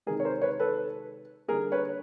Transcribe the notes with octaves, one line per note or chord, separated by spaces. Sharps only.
C3 D#3 G#3 G#4 A#4
C#5
A#4 C5
B4 C#5
A4 B4
D3 G3 A#3 G#4 A#4
B4 C#5